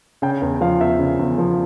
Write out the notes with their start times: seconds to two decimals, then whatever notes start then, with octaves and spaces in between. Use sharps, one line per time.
0.22 C#3 G5
0.42 E2
0.61 F3 F5
0.81 E2 E5
0.99 C#3
1.19 E2
1.38 F3